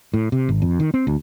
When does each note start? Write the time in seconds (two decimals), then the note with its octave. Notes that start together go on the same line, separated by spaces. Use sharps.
0.14 A2
0.32 C3
0.49 G#1
0.62 F2
0.80 D#3
0.94 C4
1.07 D2